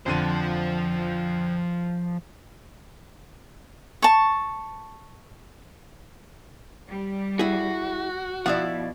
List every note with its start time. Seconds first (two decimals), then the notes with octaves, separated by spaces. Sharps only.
0.06 F2 D3 F3 C5 D#7
4.02 A5 C#6
6.89 G3
7.39 E4 F#4 G#4
8.46 B2 F3 E4 D5 F#5